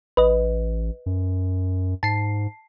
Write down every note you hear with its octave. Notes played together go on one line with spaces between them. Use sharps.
A1 B4 D#5
F#2
G#2 A5 C7